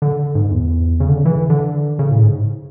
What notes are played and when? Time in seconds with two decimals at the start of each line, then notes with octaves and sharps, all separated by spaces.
0.02 D3
0.35 G#2
0.51 E2
1.00 C#3
1.09 D3
1.16 C#3
1.25 E3
1.50 D3
1.99 C#3
2.11 A2
2.23 G#2